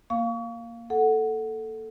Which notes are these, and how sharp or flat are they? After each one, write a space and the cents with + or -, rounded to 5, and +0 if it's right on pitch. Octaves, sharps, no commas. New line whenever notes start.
A#3 +0 F5 +0 C#6 +35
A4 +0 F#5 +0